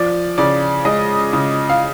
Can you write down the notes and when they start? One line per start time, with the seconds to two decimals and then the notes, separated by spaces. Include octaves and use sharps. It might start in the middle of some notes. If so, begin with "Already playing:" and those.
Already playing: F3 D5
0.38 C#3 D5
0.85 G#3 D#5
1.33 C#3
1.70 F5